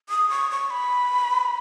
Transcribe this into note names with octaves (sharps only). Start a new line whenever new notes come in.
D#6
C#6
C#6
B5